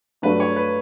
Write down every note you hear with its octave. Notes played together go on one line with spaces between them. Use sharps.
G2 F#3 A3 D4 F#4 B4
C#5
B4